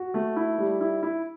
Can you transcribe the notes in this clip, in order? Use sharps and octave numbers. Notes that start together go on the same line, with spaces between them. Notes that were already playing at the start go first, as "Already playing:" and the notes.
Already playing: F#4
A3
E4
G3
E4
E4